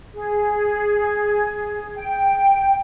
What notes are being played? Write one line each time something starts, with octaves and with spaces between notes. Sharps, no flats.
G#4
G5